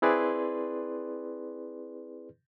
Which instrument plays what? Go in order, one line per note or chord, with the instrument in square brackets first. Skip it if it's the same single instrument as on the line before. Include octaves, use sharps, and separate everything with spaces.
[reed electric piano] C4 E4 G#4 B4 D5 C6